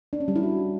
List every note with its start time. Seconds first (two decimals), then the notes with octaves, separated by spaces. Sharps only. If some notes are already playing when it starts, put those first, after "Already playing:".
0.13 D4
0.20 C#4
0.28 G3
0.36 E4
0.43 F#4